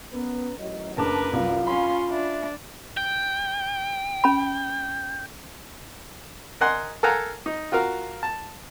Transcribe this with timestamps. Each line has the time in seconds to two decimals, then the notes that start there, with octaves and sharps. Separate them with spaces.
0.13 B3 C#4 A#4 B4
0.58 A1 D#2 F#3 D#5
0.97 F#1 D4 A#4 B4 A5 D6
1.32 C2 F#2 F4 F5
1.67 C#4 B5 C6
2.10 D4 E5
2.97 G5
4.24 C#4 B5
6.61 A#4 D#5 F#5 G#5 C6
7.03 A4 A#4 F5 F#5 G#5 A#5
7.46 D#4
7.72 F4 F#4 A#4 F5
8.23 A5